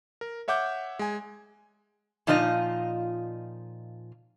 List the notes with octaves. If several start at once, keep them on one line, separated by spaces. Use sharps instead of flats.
A#4
C#5 E5 F#5 D6 G6
G#3 G#5
A#2 F3 D#4 F4 A4 D#5